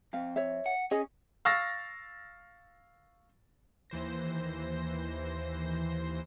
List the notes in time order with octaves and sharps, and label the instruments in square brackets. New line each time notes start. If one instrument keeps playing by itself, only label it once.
[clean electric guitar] F2 C4 [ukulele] F5
[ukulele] C#5 E5
[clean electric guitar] F#5
[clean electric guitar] C#4 [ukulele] G#4 D#5 G#5
[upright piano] F5 C#6 E6 F6 A6 A#6
[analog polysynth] D#2 E3 C5 A#6